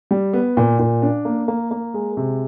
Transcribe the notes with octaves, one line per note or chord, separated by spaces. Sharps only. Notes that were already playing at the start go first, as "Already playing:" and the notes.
G3
B3
A#2
A#2
D4
A#3
A#3
A#3
G#3
C3